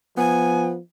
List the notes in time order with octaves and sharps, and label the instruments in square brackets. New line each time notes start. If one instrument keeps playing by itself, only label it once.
[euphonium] F3 [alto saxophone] B3 [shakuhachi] G#5